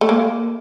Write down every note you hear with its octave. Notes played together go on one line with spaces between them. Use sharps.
A3
A#3